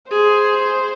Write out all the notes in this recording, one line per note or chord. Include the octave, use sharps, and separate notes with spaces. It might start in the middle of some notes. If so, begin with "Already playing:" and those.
G#4 C5